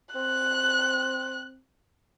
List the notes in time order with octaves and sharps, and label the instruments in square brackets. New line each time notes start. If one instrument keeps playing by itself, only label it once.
[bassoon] C4 [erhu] F#6